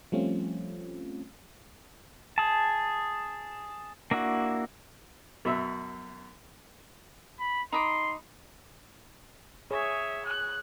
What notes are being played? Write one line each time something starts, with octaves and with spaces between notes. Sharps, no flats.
F3 G3 A3 C4 C#4 F4
G#4 A5
A#3 D4 E4 F#4
F#2 B2 E5
B5
D#4 B5 C6 D6
G#4 C#5 E5
F#6